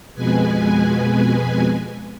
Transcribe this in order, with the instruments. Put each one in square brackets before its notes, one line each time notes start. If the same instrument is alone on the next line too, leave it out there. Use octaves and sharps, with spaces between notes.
[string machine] F2 B2 G#3 B4 G#5